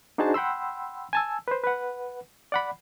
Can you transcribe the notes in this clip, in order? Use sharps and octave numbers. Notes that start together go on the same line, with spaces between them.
D4 D#4 F#4 G#4 C5 A5
F#5 G5 B5 C6 E6
G#5 A5 E6
B4 C5
B4 F#5
D5 F#5 B5